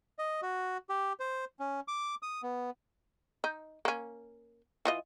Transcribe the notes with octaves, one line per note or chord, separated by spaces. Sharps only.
D#5
F#4
G4
C5
C#4
D6
D#6
B3
D#4
A#3 C#4
E3 F4 D#5